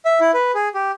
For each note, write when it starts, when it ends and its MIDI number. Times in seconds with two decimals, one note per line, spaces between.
0.05 0.19 76
0.21 0.31 64
0.34 0.52 71
0.55 0.69 68
0.75 0.91 67